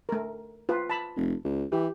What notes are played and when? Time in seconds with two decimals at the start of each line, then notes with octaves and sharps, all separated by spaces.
0.09 A3 A#4
0.69 F4 B4
0.90 A5 B5
1.16 F1
1.45 C#2
1.72 E3 G4